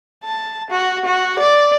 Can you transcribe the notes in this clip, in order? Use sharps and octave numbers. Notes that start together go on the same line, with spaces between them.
A5
F#4
F#4
D5